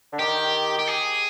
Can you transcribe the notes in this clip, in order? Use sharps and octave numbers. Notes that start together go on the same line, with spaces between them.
D3
D#3 G4
G4
G#4